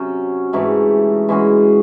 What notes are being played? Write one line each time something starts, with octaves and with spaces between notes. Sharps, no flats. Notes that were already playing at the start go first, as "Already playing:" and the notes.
Already playing: C3 F#3 C#4
G#2 E3 A3 D#4
E3 G#3 C#4 F#4